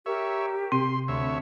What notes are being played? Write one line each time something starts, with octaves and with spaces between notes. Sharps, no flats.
G4 A#4 C#5 E5
C3 C4 C6
D2 C#5 E5 B5